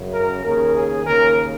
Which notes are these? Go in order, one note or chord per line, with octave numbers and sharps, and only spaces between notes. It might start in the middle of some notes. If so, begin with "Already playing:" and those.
Already playing: F#2 C#3
A#4
D#2 C#3 A#4
G#4
D#2 C#3 A#4